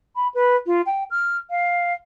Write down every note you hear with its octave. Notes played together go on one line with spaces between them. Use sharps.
B5
B4
F4
G5
F6
F5